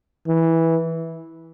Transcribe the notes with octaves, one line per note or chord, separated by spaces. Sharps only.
E3